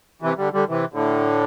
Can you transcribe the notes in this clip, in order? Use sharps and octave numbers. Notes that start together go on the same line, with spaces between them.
C3 E3
D3 G3
D3 G3
C3 E3
A2 D3